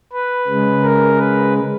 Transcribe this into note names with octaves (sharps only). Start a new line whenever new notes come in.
B4
C#3 G#3
A#4
B4